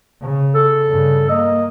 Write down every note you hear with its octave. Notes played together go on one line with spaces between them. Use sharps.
C#3
A4
G2 C#3
A#3 D#5